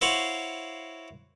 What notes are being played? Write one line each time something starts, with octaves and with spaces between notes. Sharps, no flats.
E4 F#4 C5 C#5 F5 F#5